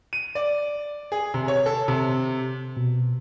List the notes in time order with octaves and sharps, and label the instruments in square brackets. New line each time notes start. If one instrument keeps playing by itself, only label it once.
[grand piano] D#7
D5
G#4
C3
C#5
A4
C3
[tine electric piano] B2